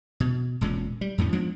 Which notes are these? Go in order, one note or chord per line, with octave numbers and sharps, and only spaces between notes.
B2
E1 A#2 G#3 C#4
G3
F2 A2 D3 C#4
F3 G#3 B3 D4